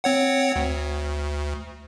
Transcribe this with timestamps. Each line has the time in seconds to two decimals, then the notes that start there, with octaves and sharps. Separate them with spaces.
0.04 C4 C#5 F#5
0.56 D2